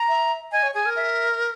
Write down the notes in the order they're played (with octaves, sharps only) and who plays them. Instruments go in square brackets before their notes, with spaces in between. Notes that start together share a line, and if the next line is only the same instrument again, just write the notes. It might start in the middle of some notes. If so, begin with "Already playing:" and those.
Already playing: [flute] A#5
[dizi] E5
[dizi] D#5 [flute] G#5
[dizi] C#5
[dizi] G#4 [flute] G#5
[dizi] A#4
[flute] E5